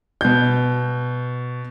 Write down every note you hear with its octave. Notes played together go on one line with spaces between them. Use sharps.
B2 G6